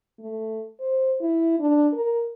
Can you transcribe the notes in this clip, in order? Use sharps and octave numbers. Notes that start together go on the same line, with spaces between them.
A3
C5
E4
D4
A#4